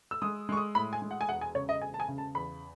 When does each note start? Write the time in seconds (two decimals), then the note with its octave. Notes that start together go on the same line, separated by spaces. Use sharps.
0.11 E6
0.22 G#3 D#6
0.49 G#3 C#6
0.57 D#6
0.75 A2 B5
0.93 G#5
1.02 G#3
1.11 F#5
1.21 G#5
1.28 E1 F#5
1.41 G#5
1.55 C#3 C#5
1.69 D#5
1.82 E1 G#5
1.94 A5
2.00 G#5
2.08 C#3
2.18 A5
2.35 E2 B5